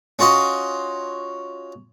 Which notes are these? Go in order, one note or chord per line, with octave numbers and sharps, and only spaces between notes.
C#4 F4 F#4 D#5 C6